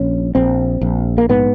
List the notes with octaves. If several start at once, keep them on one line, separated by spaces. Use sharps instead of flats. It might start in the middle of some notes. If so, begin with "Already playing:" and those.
Already playing: A#1 C#4
A#1 C4
A#1
A#3
G#2 B3